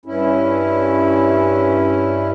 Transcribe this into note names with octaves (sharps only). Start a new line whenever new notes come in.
G2 C#4 E4